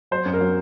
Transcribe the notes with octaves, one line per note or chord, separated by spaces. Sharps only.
F#3 C5
F#2
A#4
F#3